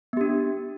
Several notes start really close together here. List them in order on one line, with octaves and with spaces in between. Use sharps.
B3 G4 D4